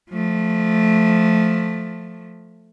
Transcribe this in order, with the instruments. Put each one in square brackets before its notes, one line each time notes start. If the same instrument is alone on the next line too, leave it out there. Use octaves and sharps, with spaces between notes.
[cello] F3 A3